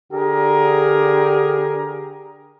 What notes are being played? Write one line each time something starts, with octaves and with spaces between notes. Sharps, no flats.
D3 G4 G#4 A#4